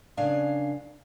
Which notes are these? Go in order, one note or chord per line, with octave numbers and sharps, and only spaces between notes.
F#2 C#3 D4 F5 G#5